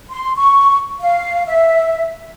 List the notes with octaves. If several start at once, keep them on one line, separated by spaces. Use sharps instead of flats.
C6
C#6
F5
E5